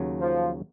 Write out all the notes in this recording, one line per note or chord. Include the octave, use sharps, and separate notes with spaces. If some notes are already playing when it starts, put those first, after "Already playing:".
Already playing: D#2 C#3 F#3
F3